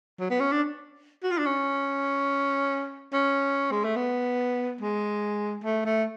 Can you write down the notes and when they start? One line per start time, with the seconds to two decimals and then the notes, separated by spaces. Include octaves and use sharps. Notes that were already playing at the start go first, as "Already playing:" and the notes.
0.20 F#3
0.30 B3
0.40 C#4
0.52 D4
1.23 F#4
1.31 F4
1.38 D4
1.46 C#4
3.13 C#4
3.71 G#3
3.84 A3
3.96 B3
4.81 G#3
5.64 A3
5.85 A3